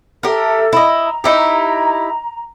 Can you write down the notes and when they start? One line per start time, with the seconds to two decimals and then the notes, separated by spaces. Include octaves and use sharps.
0.23 G4 A4 A#4 E5
0.73 E4 D#5
1.02 A#5
1.24 D#4 E4 G4